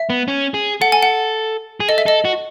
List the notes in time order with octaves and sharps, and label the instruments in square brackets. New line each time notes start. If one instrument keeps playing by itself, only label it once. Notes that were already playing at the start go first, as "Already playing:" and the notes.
Already playing: [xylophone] E5
[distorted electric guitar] B3
C#4
G#4
[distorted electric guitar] A4 [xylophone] F#5
[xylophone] G#5
F#5
[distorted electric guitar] G#4
[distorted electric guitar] A4 [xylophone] D#5
[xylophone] E5
[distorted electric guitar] A4 [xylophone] D#5
[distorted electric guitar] F#4